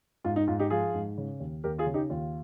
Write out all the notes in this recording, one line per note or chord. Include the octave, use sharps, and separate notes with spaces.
G#2 F4
D#4
G#2 F4
D#4 G4
F3 F4 G#4
G#2
C#3
D#2
D#2 G4 A#4
F4 G#4
C#3
D#4 G4
D#2 F4